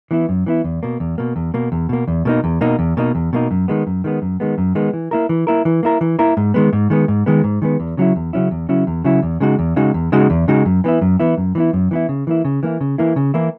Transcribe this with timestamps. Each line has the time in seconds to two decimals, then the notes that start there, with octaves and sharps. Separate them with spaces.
0.11 E3 B3 E4
0.29 F#2
0.46 E3 B3 E4
0.64 E2
0.83 B2 A#3
1.00 E2
1.18 B2 A#3
1.36 E2
1.54 B2 A#3
1.72 E2
1.89 B2 A#3
2.08 E2
2.25 B2 A#3 D#4
2.44 E2
2.61 B2 A#3 D#4
2.79 E2
2.97 B2 A#3 D#4
3.15 E2
3.33 B2 A#3 D#4
3.51 F#2
3.68 D#3 G#3 B3
3.87 F#2
4.04 D#3 G#3 B3
4.22 F#2
4.40 D#3 G#3 B3
4.58 F#2
4.75 D#3 G#3 B3
4.93 E3
5.11 A#3 E4 A#4
5.29 E3
5.47 A#3 E4 A#4
5.65 E3
5.83 A#3 E4 A#4
6.01 E3
6.19 A#3 E4 A#4
6.37 G#2
6.54 D#3 G#3 B3
6.73 G#2
6.90 D#3 G#3 B3
7.08 G#2
7.26 D#3 G#3 B3
7.44 G#2
7.62 D#3 G#3 B3
7.80 E2
7.97 C#3 F#3 C#4 E4
8.16 E2
8.33 C#3 F#3 C#4 E4
8.51 E2
8.69 C#3 F#3 C#4 E4
8.87 E2
9.04 C#3 F#3 C#4 E4
9.23 E2
9.40 C#3 G#3 D#4 F#4
9.59 E2
9.76 C#3 G#3 D#4 F#4
9.94 E2
10.12 C#3 G#3 D#4 F#4
10.30 E2
10.48 C#3 G#3 D#4 F#4
10.65 F#2
10.84 E3 B3 E4
11.01 F#2
11.19 E3 B3 E4
11.37 F#2
11.55 E3 B3 E4
11.73 F#2
11.91 E3 B3 E4
12.09 C#3
12.27 E3 A#3 E4
12.45 C#3
12.63 E3 A#3 E4
12.81 C#3
12.98 E3 A#3 E4
13.16 C#3
13.34 E3 A#3 E4